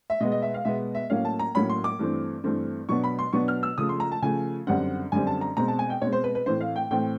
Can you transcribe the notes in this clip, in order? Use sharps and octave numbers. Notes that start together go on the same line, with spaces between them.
E5
B2 G#3 B3 D#5
D#5
E5
F5
B2 G#3 B3 E5
E5
A2 F#3 A#3 C#4 F5
A5
A#5
A2 F#3 A#3 C#4 B5
C6
D6
G2 E3 A3 C4
G2 E3 A3 C4
B2 F#3 B3 D4 C#6
B5
C6
B2 F#3 B3 D4 C#6
F6
E6
C#3 F3 A3 D#6
C6
A#5
A5
C#3 F3 A3 G#5
F#2 D3 G3 C4 F#5
F#2 D3 G3 C4 G#5
A5
A#5
B2 G#3 C4 A#5
A5
G#5
G5
B2 G#3 C4 C#5
C5
B4
B4
A2 E3 A3 C4 C5
F5
G5
A2 E3 A3 C4 G5